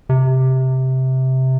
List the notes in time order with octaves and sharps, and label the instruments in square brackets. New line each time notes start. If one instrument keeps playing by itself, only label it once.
[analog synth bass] C3